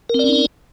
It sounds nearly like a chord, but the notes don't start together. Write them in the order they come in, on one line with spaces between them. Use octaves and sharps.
A#4 C4 D5 C#4 D#4